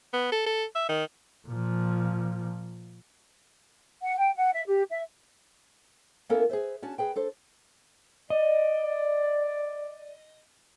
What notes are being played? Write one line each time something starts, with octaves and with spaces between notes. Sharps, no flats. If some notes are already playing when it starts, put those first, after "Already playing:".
B3
A4
A4
E5
D#3
A#2 F3
F#5
G5
F#5
E5
G4
E5
A#3 B3 C#4 E4 A4 A#4
G#4 B4 C5 E5
C#4 D4 F#4 A5
G#4 B4 G5
D4 A4 C5
D5 D#5